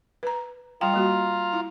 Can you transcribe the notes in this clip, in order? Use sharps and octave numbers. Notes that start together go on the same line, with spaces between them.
B4 A#5
G3 F4 F5 G5 A#5
G3 A#3 F#4
E4